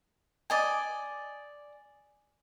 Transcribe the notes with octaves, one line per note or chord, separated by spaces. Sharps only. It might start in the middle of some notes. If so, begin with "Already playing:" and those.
D5 D#5 G#5